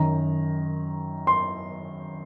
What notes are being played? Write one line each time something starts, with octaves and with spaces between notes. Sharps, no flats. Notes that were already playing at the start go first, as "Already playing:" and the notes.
Already playing: F#2 D#3 A#5
C6